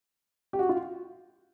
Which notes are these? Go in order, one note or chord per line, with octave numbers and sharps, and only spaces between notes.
G4
F#4
F4